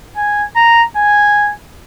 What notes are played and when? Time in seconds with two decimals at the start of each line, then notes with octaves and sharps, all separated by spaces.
0.17 G#5
0.56 A#5
0.97 G#5